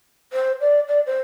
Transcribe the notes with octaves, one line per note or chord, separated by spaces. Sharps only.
C5
D5
D5
C5